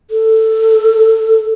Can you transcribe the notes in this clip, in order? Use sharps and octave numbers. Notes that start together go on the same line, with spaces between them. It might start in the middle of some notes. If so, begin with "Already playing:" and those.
A4